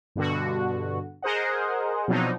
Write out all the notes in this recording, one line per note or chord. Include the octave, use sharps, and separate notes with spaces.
G2 B2 D3 F#4
G#4 A#4 C5 D#5 F#5
B2 F3 F#3 C4 D4 D#4